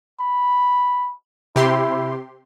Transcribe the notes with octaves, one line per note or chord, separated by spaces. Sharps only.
B5
C3 E4 G4 C6